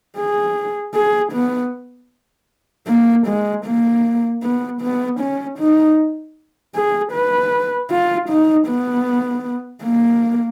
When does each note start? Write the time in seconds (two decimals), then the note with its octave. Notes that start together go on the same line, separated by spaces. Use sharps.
0.17 G#4
0.94 G#4
1.33 B3
2.88 A#3
3.27 G#3
3.66 A#3
4.43 B3
4.82 B3
5.20 C#4
5.59 D#4
6.75 G#4
7.12 B4
7.90 F4
8.29 D#4
8.68 B3
9.83 A#3